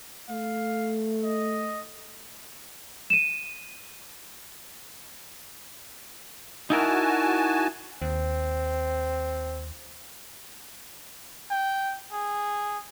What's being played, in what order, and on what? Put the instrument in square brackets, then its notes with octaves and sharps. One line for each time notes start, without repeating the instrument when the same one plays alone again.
[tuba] A3 [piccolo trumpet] F5
[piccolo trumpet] D#5
[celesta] D#7 E7
[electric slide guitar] D#4 E4 A#4 [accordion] F#4 G#5 A5
[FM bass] D#2 [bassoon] C4
[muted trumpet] G5
G#4